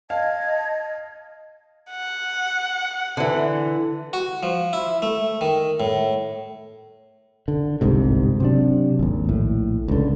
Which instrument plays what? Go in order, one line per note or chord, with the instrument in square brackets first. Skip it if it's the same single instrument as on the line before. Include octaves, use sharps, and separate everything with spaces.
[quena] D#5 [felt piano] F5 [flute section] A5 G#6
[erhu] F#5
[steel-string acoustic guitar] D3 E3
[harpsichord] F#4
F3
E4
A3
D#3
A2
[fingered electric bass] D3
G1 C2 G#2 C3
C3 F#3 D4
G#1 D#2
A#1 A2
C#2 D3